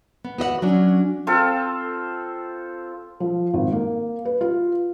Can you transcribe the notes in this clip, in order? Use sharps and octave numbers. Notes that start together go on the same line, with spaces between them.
B3
B3 F#4 D#5 F#5
F#3 C#4 D4
C4 F4 A4
F3
G#1
A#3
B4
F4